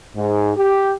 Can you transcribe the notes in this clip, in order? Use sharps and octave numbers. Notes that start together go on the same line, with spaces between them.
G#2
G4